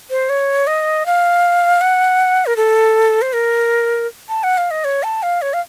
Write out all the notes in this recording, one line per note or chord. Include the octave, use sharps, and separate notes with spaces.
C5
C#5
D#5
F5
F#5
A#4
A4
C5
A#4
A5
F#5
F5
D#5
C#5
A5
F5
C#5
F5